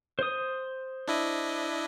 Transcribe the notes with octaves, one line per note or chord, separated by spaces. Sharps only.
C5 D#6
D4 E4 D#5